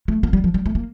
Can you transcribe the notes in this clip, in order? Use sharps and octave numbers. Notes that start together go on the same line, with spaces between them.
A3
A#3
G3
F3
G3
A3
A#3